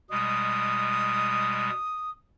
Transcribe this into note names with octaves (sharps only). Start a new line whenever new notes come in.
B2 G3 G#3 D#6